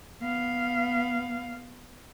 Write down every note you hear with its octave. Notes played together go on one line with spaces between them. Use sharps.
B3 F5